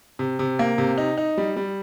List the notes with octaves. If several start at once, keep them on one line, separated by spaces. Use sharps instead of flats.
C3
C3
A#3
C3
D#4
D#4
G3
G3